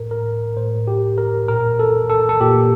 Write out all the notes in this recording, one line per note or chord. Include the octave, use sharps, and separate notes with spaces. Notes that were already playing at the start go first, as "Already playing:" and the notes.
Already playing: A2 A#4
A#4
A2 C5
G4
A#4
A#2 A#4
A4
A4
A4
A#2 G4